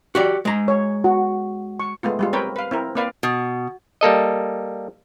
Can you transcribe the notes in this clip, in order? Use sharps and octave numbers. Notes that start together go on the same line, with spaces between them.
F#4 G4 D5
G#3 A#5
C#5
F#4
C#6
G#3 A3 B3 F4
G3 G#3 F4
C4 A#4 B4 C#5 G5
B4 F5
C4 E4 A#4
A#3 C4 B4 D5 F5
B2
G3 A#3 A4 D#5